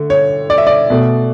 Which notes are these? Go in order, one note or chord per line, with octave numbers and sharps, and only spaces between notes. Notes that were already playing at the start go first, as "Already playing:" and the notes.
Already playing: D3 A3
C#5
D5
E5
D5
B2 A3